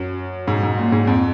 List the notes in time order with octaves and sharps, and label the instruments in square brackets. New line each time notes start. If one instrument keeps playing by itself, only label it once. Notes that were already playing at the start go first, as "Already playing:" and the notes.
Already playing: [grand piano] F#2
G#2
G#2
A#2
G#2
F2